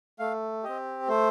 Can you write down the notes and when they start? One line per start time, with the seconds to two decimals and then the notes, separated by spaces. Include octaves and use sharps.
0.19 A3 F5
0.64 C4 G4 D#5
1.08 A3 C5